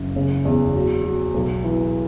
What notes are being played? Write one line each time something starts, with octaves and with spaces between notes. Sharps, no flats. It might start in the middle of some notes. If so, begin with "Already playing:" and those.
Already playing: F#1
C#3
E2
F#3
F#3
B1
E3